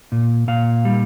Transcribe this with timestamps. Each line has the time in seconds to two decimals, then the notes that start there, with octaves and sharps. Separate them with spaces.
0.12 A#2
0.48 A#2 F5
0.85 G3